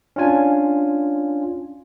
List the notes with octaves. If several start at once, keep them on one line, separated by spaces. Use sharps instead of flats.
C#4 D4 F4 G#5